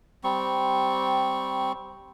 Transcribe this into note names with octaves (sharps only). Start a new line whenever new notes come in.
G3 C4 C#6